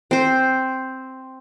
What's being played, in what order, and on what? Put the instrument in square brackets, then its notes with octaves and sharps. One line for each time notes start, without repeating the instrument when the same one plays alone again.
[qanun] C4 C5